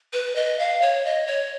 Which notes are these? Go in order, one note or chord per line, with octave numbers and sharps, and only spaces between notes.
B4
D#5
F5
C#5
D#5
C#5